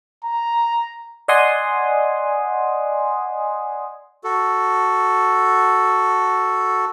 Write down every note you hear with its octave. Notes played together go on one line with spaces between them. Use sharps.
A#5
D5 D#5 F#5 G#5 C6 D#6
F#4 A4